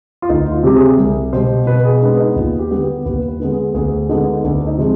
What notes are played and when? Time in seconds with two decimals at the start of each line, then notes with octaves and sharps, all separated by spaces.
0.22 F4
0.29 D2 D#4
0.52 F4
0.63 C3 G3 G4
0.76 G#4
0.98 C2
1.33 B2 G3 C5
1.67 B2 B4
1.85 G#4
2.02 G#3 B3 D4
2.20 D#4
2.36 D#2 F4
2.59 G4
2.71 D3 G3 B3
2.82 G4
3.06 D#2 B4
3.28 B4
3.40 D3 G#3 B3
3.51 G#4
3.74 D2 G#4
4.09 D3 G#3 B3 D#4
4.44 D2 D4
4.67 D#4
4.78 C3 F3 G#3